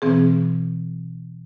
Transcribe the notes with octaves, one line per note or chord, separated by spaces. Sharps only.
B2 E3 C4 G#4